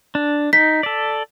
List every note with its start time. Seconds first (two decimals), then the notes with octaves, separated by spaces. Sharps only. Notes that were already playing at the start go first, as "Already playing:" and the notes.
0.15 D4
0.53 D#4 B6
0.83 A4 D5